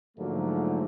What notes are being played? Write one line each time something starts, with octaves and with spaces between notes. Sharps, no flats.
G#2 D3 F3 F#3 A3 A#3